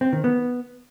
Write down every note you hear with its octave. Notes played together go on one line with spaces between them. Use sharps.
C4
D#3
B3